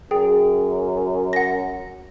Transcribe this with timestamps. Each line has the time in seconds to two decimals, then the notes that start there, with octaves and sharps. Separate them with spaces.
0.11 F#2 G#4 G5
1.33 F#5 A#6